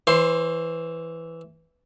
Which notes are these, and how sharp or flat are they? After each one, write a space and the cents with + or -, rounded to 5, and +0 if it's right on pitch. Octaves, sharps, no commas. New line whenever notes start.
E3 +0 C5 +30 C6 +0